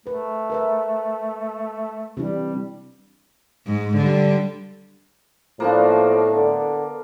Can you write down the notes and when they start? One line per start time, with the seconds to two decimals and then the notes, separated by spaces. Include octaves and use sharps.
0.06 A3 A#4 B4
0.50 A#4 B4 E5
2.17 C3 E3 G3 D4
3.67 G#2
3.97 D3 G3
5.60 A2 F3 A#3 B3 D4
6.31 D3